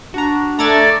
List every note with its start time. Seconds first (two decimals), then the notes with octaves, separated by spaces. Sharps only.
0.14 D4 F#4 A#5
0.59 A3 A4 D5 A#5 G#6 A6